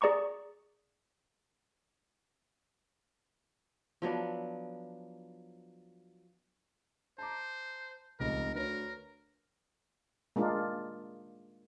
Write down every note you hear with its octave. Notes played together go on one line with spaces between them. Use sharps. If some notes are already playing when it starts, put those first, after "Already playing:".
G#4 D5 A#5 C#6 D6
F3 F#3 B3 D4
C5 A5 A#5 D6
F1 C#2 A#4
D2 A#4 B4 C#5
G#3 A#3 D4 F4